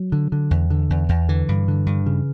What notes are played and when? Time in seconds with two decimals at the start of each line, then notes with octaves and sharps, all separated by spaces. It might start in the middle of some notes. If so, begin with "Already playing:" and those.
Already playing: F#3
0.12 D3
0.32 D3
0.51 E2
0.70 D3
0.90 E2
1.09 E2
1.29 D3 E3
1.49 G2
1.68 D3
1.86 G2
2.06 C#3